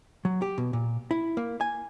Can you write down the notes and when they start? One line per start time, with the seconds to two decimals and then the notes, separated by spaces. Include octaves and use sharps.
0.25 F#3
0.42 G4
0.58 B2
0.73 A#2
1.11 E4
1.37 A#3
1.61 G#5